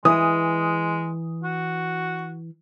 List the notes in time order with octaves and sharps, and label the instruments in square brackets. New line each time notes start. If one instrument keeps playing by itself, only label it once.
[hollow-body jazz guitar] E3 [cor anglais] G#3 [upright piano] D#6
[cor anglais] F#4